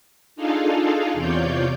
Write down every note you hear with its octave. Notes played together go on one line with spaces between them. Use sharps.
D4 D#4 F4 G#4 A4 F5
E2 C3 F4 C#5 D5 G6